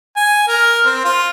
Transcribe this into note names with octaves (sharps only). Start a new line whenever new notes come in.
G#5
A#4
C4
F4